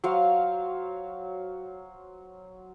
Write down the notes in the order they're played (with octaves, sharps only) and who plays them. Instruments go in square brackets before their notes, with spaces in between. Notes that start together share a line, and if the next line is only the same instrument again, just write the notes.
[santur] F#3 C5 C#5 F5